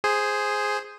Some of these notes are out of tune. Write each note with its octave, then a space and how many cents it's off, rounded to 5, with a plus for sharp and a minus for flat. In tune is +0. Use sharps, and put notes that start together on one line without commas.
G#4 +0 C5 +0